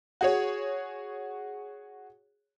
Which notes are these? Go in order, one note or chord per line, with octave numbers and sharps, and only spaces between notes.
F#4 G#4 C#5